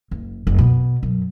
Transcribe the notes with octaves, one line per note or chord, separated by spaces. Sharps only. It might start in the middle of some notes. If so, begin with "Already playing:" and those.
F#1
F#1
B2
F#2